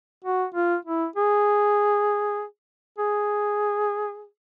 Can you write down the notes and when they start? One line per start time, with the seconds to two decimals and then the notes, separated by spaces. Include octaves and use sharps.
0.24 F#4
0.55 F4
0.85 E4
1.16 G#4
2.99 G#4